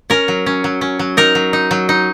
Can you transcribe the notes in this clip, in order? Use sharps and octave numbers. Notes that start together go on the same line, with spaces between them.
C#4 A#4
F#3
C#4
F#3
C#4
F#3
D#4 A#4
F#3
D#4
F#3
D#4